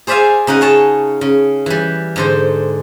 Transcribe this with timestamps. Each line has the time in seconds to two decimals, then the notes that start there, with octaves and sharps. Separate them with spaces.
0.07 G#4 C5 D5 E5 F5 G#5
0.47 C#3 D#4 D#5 F#5
0.61 G#4 C#5 A5
1.21 C#3
1.66 E3 G3
2.16 G#2 D3 C5